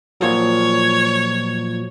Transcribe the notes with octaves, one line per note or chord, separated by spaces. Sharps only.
A#2 F3 F#3 C#5